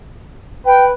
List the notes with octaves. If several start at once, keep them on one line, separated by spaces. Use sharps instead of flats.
B4 G5